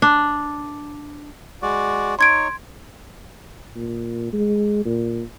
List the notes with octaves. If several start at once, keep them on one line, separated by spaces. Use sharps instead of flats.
D4
G#3 F#4 D5
D#4 C#5 C6 G#6 D7
A#2
G#3
A#2